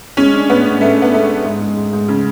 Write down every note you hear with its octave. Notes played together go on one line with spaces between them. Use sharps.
G#3 C#4
D4
A2 B3
A2
A2 A3
B3 D4
G#3 A3
B3
G#2
G#3
G#2
G#2
C#3